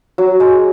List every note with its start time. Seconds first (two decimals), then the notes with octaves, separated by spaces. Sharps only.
0.18 F#3 F#4
0.40 G#3 G#4